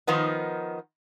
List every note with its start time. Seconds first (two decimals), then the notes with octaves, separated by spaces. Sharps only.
0.07 D#3 F3 B3 D#4